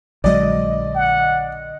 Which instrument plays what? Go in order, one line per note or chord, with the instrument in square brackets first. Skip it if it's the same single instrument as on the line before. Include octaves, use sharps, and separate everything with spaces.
[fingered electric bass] A#1 F#3 G#3 [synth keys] D3 D#5 [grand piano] D5
[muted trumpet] F#5